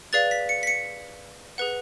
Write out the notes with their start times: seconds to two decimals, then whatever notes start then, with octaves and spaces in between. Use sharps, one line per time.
0.13 G#4 B4 D5 F5 A6
0.31 B6
0.49 C#7
0.63 B6
0.67 C#7
1.58 G#4 B4 F#5